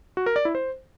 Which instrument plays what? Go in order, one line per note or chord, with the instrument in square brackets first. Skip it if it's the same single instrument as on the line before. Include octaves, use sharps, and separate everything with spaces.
[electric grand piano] F#4
A#4
D5
E4
C5